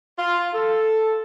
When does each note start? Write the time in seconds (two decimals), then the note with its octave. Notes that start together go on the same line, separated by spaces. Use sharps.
0.18 F4
0.53 A4